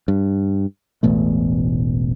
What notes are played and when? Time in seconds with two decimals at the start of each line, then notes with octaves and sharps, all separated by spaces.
0.08 G2
1.03 E1 A1 B2 A3